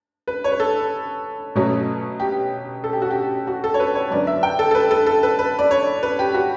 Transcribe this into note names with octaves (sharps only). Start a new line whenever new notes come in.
B4
C#5
B4
A4
B2 F#3 A3 C#4
G4
A4
G4
F#4
G4
F#4
A4
C#5
B4
C#5
F#2 D3 F#3 B3 D5
E5
G5
A4
A4
B4
A4
A4
B4
B4
D5
C#5
B4
G4
F#4